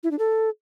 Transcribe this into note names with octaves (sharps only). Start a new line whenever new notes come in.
E4
D4
A4